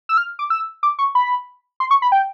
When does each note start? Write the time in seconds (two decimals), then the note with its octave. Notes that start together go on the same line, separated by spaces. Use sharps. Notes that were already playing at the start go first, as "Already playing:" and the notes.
0.09 E6
0.17 F6
0.39 D6
0.50 E6
0.83 D6
0.99 C#6
1.15 B5
1.80 C6
1.91 C#6
2.02 B5
2.12 G5